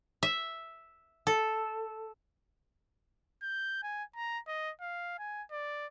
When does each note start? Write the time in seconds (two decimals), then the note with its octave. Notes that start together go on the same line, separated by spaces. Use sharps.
0.23 E5
1.27 A4
3.43 G6
3.83 G#5
4.16 A#5
4.47 D#5
4.81 F5
5.19 G#5
5.51 D5